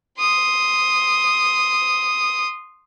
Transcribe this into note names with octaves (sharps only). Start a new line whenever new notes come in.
C6 D#6